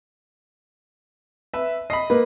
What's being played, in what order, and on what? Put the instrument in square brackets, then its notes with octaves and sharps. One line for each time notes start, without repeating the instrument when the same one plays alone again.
[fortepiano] B4 E5
[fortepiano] D#5 B5 [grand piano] C7
[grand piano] A#3 [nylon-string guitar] B4